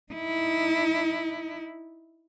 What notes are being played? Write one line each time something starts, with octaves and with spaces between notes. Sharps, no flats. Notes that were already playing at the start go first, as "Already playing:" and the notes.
D#4 E4